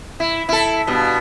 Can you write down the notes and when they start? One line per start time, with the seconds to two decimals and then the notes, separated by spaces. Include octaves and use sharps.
0.20 E4
0.49 E4 A4
0.87 G2 B2